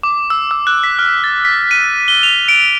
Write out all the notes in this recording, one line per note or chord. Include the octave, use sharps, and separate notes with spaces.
D6
E6
E6
F#6
B6
F6
A6
B6
D#7
G7
F7
D7